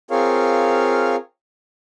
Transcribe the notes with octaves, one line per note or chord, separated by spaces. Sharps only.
C4 F4 G#4 A#4 C#5 F5